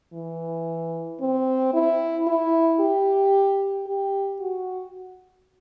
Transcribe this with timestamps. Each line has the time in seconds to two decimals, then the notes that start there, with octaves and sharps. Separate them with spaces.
0.13 E3
1.21 C4
1.73 E4
2.27 E4
2.80 G4
3.87 G4
4.40 F#4